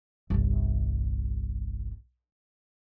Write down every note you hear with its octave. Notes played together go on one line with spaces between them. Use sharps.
G1 C2